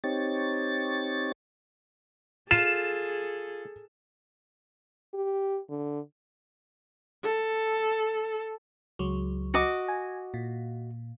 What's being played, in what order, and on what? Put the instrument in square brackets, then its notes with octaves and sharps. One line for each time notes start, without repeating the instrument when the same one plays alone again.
[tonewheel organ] C4 D#4 G4 C#5 A6
[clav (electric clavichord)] F4 [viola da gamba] G#4 A4 [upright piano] E7
[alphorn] G4
D3
[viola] A4
[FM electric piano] C#2 F#3
[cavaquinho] F#4 D#5 D6
[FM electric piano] G#5
A#2